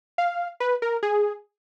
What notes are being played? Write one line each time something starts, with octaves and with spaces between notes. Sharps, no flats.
F5
B4
A#4
G#4